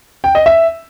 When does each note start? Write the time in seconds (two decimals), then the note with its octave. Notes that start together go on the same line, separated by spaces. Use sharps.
0.24 G5
0.35 D#5
0.46 E5